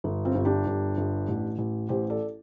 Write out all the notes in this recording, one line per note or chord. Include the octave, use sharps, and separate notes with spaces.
G1
C4 F4
G1
D4 G4
G1
G1
A1
A1
A1 G4 C5
A4 D5